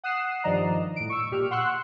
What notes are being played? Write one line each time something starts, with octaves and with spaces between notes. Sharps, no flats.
F#5 D#6 F#6 C7 E7
G2 D#3 F3 D5 D#5 A#5
A2 D7
C#6 E6
A#2 G4 F6
F#5 C6 C#6 E6 F#6